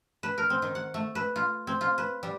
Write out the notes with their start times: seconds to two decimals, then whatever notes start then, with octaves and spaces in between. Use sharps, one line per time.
0.23 B4
0.38 A#4
0.50 C4
0.62 D#3
0.75 F#5
0.94 A3
1.15 B4
1.36 F4
1.67 C4
1.81 F4
1.98 B4
2.23 G3